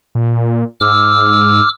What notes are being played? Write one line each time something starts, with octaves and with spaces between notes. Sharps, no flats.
A#2
G#2 D6 E6 F6